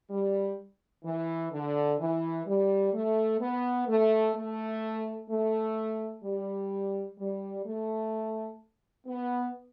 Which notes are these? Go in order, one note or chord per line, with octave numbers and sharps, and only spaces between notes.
G3
E3
D3
E3
G3
A3
B3
A3
A3
A3
G3
G3
A3
B3